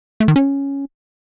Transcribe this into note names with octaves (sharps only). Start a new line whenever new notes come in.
A3
D#3
C#4